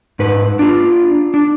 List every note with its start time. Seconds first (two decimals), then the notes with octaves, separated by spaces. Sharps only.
0.19 G#2 B4
0.59 D4 F4
1.34 D4